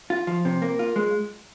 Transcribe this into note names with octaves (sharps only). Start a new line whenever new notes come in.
F4
F3
C3
A#3
F4
G#3